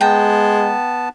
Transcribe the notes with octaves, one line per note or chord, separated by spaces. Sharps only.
G#3 B3 G5 A5 A#5